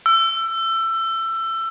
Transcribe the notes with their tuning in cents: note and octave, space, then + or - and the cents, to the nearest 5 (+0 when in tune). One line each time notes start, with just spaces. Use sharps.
E6 +25